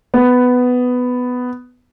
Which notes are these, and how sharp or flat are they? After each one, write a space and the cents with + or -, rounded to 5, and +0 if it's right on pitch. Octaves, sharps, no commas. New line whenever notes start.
B3 +10